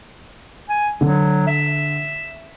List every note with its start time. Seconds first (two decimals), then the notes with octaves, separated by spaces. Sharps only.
0.69 G#5
1.01 D3 F#3
1.47 E5